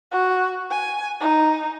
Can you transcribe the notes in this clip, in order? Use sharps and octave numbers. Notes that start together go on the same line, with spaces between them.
F#4
G#5
D#4